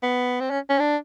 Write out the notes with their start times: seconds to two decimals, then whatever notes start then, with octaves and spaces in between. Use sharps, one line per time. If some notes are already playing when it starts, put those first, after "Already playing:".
0.03 B3
0.40 C4
0.50 C#4
0.69 C#4
0.79 D4